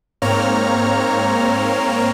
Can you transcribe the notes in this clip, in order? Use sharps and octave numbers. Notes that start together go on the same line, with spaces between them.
G#2 A#3 C4 C#5 A#5 F6